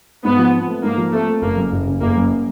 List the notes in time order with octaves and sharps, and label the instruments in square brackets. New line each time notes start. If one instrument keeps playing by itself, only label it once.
[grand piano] G#2 [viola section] B3
[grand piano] F3
C4
A3
[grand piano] G#2 [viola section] A#3
[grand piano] F3
[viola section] A3 [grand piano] C4
[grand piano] A3
[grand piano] F#1 [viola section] A#3
[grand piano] F#2
F#1
C#3
[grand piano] F#1 [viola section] A#3
[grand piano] F#2